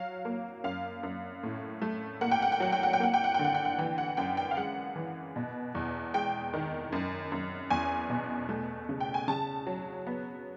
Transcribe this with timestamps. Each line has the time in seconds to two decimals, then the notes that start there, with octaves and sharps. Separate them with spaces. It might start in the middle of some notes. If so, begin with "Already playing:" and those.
Already playing: F#3 F5
0.25 A#3
0.64 F#2 F5
1.03 F#2
1.43 A2
1.82 A3
2.21 A#3 F#5
2.31 G5
2.42 F#5
2.52 G5
2.60 F#3 F#5
2.72 G5
2.83 F#5
2.93 G5
3.00 A#3 F#5
3.14 G5
3.24 F#5
3.34 D3 G5
3.44 F#5
3.54 G5
3.65 F#5
3.78 E3 G5
3.98 F#5
4.17 F#2 G5
4.37 G5
4.51 F5
4.57 G#3 F#5
4.96 E3
5.36 B2
5.75 E2
6.14 G#3 G5
6.54 D#3
6.92 F#2
7.32 F#2
7.70 E2 G#5
8.10 B2
8.49 A3
8.89 C#3
9.00 G5
9.14 G#5
9.28 C#3 A5
9.67 F#3
10.07 B3